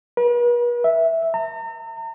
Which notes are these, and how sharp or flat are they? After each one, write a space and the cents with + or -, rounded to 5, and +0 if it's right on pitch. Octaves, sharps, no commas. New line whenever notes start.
B4 -45
E5 -5
A#5 -40